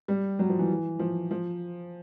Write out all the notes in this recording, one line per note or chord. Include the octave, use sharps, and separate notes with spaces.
G3
F#3
F3
E3
F3
F3